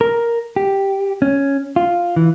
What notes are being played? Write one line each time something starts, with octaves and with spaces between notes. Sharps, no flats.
A#4
G4
C#4
F4
E3